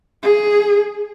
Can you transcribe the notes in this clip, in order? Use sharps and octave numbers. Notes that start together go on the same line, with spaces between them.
G#4